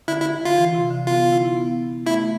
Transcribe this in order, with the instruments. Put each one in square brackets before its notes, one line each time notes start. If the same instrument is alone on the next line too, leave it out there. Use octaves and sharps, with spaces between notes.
[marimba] D3 [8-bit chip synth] E4
[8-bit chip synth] E4
F4
[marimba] E3
C3
D3
[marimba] B3 [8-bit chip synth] F4
[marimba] E4
E4
B3
[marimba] A3 [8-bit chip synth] E4